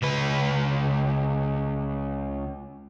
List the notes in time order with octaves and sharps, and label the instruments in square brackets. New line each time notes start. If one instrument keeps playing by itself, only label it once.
[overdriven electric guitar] C#2 B4